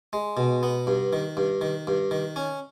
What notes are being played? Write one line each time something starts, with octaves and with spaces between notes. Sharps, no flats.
G#3
B2
B3
G2
D#3
G2
D#3
G2
D#3
C#4